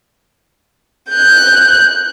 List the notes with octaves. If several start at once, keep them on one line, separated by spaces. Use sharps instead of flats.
F#6 G6